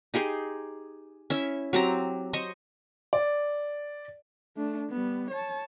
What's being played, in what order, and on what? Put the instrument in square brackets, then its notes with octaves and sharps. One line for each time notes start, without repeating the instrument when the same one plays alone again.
[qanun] D#4 G4 G#4 C6
C#4 E4 E5
F#3 C4 G4 A#5
C5 D#5 C#6
[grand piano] D5
[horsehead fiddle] A3 D4
G3 B3
C#5 A5